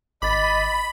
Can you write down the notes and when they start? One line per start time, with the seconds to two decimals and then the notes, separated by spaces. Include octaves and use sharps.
0.22 G#1 D#5 B5 D6 A6